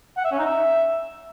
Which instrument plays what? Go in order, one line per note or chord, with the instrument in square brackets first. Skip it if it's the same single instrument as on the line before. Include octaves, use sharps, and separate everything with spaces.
[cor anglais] F#5
E5
C#4
D#4
E5